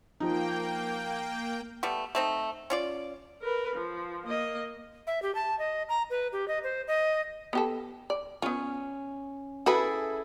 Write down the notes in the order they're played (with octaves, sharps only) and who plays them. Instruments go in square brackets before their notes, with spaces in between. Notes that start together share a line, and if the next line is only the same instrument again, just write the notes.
[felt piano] F3 D#4 [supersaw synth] A#3 G5
[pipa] G3 A3 B3
A3 C4 D#4
C#4 F4 D5
[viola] A#4 B4
F3
A#3 D#5
[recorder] E5
G4
A5
D#5
A#5
B4
G4
D#5
C5
D#5
[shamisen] B3 G4 A4
D5
[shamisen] B3 F4 [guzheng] C#4
[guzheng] E4 G#4 A4 [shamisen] F#4 B4